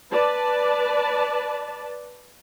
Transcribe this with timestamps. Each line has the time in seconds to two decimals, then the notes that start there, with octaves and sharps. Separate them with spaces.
0.12 B4 D5 A5